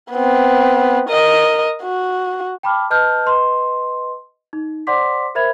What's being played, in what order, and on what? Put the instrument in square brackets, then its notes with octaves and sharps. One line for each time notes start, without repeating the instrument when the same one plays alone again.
[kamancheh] B3 C4
A#4 D#5
F#4
[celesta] G5 A5 B5 D6 F6
B4 D#5 A5 F6 G6
B4 D#5 C6
D#4
C5 D5 F#5 C6 D6 B6
A#4 C5 E5 B5 G#6 F7